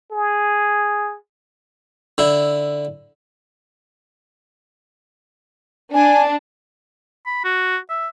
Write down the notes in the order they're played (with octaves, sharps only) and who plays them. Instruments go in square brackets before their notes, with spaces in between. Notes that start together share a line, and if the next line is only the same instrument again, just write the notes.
[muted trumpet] G#4
[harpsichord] D3 E4
[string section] D4 [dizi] G#5
[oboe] B5
F#4
E5